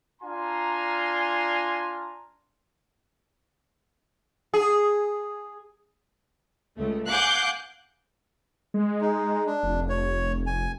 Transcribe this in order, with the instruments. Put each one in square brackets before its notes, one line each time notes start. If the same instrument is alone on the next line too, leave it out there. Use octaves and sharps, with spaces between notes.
[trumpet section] D4 F4 G#5 A#5 C6
[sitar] G#4
[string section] C#2 A3
F5 F#5 G#5 D6 F#6 G6
[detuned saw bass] G#3
[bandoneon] D#4
D4
[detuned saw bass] F1
[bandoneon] C#5
G#5